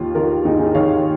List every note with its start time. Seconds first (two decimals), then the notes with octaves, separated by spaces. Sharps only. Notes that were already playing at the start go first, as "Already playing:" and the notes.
Already playing: D#2 D#3 F4
0.15 D#3 F4 A#4
0.45 D#2 D#4 G#4
0.60 D#4 G#4
0.75 D#3 C#5 F5